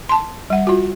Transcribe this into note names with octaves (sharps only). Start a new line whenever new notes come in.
A5 C6
G3 F#5
F4 F#4